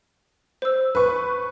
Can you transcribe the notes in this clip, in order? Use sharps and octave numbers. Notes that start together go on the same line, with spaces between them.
C5 E6
B4 C#6